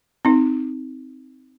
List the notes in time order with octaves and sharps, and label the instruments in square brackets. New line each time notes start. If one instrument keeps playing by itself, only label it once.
[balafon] C4 D#4